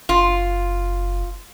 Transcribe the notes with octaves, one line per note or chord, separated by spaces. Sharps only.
F#1 F4